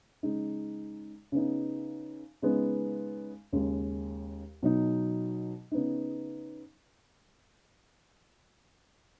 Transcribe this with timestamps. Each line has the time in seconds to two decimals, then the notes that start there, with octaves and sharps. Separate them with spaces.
0.23 C#3 G#3 D#4
1.32 C#3 B3 D#4
2.42 C#3 G#3 B3 D#4
3.53 D#2 C#3 G#3
4.63 B2 F#3 D#4
5.72 C#3 B3 D#4